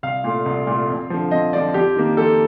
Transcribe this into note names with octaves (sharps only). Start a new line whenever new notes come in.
C2 F5
A#2 A3
C2
A#2 A3
F2
D3 F3
F2 D#5
D3 F3 D5
F2 G4
D#3 A#3
F2 A4